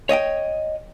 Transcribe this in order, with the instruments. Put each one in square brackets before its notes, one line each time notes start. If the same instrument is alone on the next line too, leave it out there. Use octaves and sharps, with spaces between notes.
[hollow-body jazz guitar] C#5 D#5 F5 G5